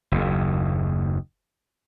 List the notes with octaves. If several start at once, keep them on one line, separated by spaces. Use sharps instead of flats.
F#1 D#2